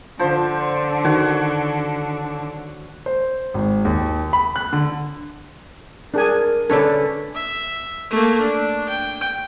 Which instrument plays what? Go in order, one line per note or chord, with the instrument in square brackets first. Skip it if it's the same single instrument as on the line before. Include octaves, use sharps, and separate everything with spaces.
[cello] D3 [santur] F3 C5
[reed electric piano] D#3 [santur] F#4 C#5
[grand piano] C5
G#1
D#2
B5
F#6
D3
[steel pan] D4 G#4 G#5 [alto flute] A#4
[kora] D3 B4 C#5 [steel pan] C#4 D4 A4
[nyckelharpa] E5
A3 A#3
D4
G5